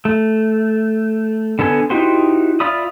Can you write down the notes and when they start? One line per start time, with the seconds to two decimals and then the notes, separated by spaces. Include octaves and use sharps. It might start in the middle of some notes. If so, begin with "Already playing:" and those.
0.05 A3
1.59 D3 B3 A4 G#5
1.90 D#4 E4 F#4 G4 C5
2.60 F4 D5 E5 B5 D#6